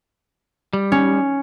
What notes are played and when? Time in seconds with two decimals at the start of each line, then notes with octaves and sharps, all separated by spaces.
0.73 G3
0.92 C#4